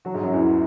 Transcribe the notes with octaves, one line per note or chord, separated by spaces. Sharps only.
F#3 F#4
G#2 G#3
F#2 F#3
E2 E3